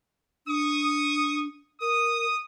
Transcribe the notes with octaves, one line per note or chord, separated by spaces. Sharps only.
D4 C#6 D#6
A#4 D#6